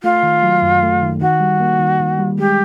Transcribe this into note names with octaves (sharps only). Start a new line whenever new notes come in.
A3 F4
D#3
F#3
F#2
A3
D#3
D#3 F#4
G3
A#3
D#3
D#3
G3
G#3 G4